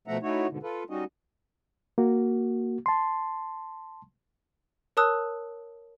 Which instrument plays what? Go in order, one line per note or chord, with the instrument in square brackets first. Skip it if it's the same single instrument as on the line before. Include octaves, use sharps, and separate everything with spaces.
[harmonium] B2 F3 A3 E5 F#5 A#5
A3 D#4 E4 F#4 C#5
G#2 B2 D3
F4 A4 B4
G3 C#4 D#4 F#4 D#5
[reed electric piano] A#3 F#4
A5 C6
[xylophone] A#4 C#5 A5 D#6 E6 F#6